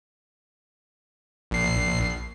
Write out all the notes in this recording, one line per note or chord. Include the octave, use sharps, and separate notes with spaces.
A#1 C7